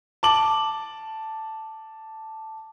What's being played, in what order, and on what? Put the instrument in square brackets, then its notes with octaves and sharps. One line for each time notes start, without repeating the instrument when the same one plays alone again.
[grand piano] A5 D6 F#7